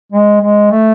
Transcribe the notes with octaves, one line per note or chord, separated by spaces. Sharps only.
G#3
G#3
A3